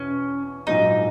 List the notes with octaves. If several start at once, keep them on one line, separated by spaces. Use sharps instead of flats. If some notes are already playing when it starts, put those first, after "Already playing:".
Already playing: E2 B2 C#4
A#1 G#2 F#3 D#4